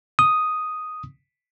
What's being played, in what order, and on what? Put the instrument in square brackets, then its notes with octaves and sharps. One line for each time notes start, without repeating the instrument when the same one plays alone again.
[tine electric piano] D#6